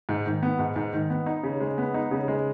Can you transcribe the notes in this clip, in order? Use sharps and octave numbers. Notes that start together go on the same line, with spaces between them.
G#2
D#3
B3
G#2
G#2
D#3
B3
D#4
C#3
G#3
B3
D#4
C#3
G#3